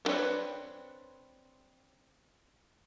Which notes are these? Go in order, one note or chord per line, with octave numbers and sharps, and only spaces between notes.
B3 C4 D4 B4 C#5